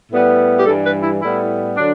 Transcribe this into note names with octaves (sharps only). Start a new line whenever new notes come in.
A2 G3 B3
G4
G2 E3 G3 A4
B4
E4
A2 G3 B3 E4
D3 F#3 D4